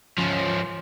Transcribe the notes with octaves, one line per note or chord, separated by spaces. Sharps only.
F3 C#4